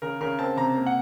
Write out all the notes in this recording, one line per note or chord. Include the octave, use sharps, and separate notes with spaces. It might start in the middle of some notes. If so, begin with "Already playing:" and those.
C#3 A#4
C#3 A#4
C4 A5
C3 A#5
A#3
F#5